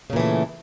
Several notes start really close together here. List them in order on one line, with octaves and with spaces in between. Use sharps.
C#3 A#2 E3 A3